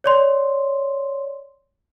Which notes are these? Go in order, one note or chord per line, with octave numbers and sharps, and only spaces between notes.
C#5 D5 C6